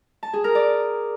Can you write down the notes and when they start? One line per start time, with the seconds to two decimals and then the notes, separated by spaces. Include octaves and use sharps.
0.23 A5
0.33 G#4
0.44 A#4
0.55 D5